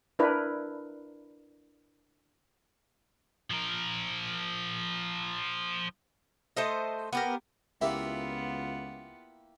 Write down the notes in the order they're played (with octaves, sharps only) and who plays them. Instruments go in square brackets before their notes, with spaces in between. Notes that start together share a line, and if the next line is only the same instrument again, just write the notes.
[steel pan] D4 E4 A#4 B4
[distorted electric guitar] F3 A#4
[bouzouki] A3 A4 C5 D#5
B3 G4 A#4
[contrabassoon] C#2 [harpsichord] A#3 E4 G4 [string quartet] B3 F4 F#5 [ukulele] E5